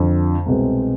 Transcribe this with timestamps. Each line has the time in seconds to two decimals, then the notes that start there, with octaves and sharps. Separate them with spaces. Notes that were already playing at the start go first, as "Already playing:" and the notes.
Already playing: F2 D3 F3
0.46 C2 B2 G#3 C4